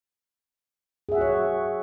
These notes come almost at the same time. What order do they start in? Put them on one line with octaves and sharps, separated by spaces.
G#4 E5 F#5 F#4 C#5